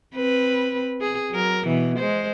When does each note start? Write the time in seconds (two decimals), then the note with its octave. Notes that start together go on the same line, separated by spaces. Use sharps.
0.15 C4 B4
1.01 G#4
1.31 F#3 A#4
1.66 B2 E3
1.99 G#3 C5